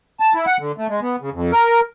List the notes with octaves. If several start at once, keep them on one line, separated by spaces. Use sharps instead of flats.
A5
E4
F#5
D3
A3
G#3
B3
C#3
F2
A#4